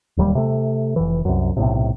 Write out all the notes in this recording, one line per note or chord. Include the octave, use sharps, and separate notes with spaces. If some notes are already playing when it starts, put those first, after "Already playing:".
D1 D#2 D#3 G3
C3 A3
F1 E3
C2 F#2
B1 A2 C3